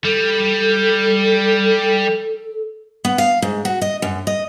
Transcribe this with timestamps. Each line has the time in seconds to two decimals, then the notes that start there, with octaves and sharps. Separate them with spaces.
0.04 G3 A4
3.05 B3
3.18 F5
3.42 G#2
3.65 F#4
3.81 D#5
4.02 F#2
4.27 D#5